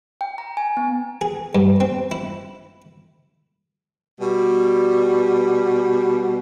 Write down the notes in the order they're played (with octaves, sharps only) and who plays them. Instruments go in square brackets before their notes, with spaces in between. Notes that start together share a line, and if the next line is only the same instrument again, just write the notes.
[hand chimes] G5
A#5
G#5
B3
[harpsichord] G#4
G2
C4
E4
[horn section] B2 G3